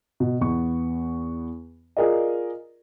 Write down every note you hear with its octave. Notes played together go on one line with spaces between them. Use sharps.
B2
E2 B3 C#6
F4 G#4 A#4 D5 D#5